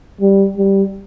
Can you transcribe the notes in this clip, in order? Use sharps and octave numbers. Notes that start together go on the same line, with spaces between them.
G3
G3